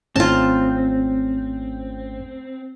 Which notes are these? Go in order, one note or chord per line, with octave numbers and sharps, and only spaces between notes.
G#1 A3 C4 C#4 F4 A5